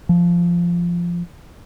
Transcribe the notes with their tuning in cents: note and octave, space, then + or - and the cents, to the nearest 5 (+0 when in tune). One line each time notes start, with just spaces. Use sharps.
F3 -10